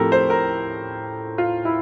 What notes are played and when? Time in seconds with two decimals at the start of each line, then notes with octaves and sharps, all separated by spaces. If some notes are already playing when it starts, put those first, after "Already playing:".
Already playing: A2 F3 A3 C4 G4 A4 A#4
0.12 C5
0.30 A#4
1.38 F4
1.65 E4